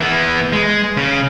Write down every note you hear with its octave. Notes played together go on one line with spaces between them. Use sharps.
E3 B3
G#3
C#3